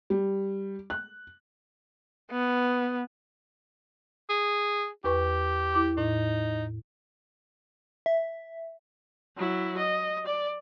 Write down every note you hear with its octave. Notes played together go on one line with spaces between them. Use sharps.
G3
F#6
B3
G#4
E2 G4 B4 C#6
E4 D6
A2 D#4
E5
F#3 E4
D#5
D5